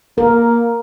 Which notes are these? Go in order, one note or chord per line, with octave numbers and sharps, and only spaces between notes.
A#3 A#4